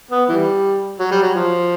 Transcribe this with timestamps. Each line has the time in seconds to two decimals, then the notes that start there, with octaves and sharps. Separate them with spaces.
0.11 B3
0.29 E3 G3
0.99 F#3
1.11 G3
1.22 F#3
1.35 F3